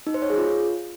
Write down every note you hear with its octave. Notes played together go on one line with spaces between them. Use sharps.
D#4
C5
C#5
G#4
F4